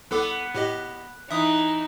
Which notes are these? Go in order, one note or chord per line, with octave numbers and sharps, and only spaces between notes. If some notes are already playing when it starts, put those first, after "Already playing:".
C2 B3 A4 D6
A2 G4 D#5
E3 D#4 E5 D#6